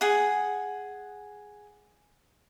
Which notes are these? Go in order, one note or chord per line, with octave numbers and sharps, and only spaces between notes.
G#4 F#5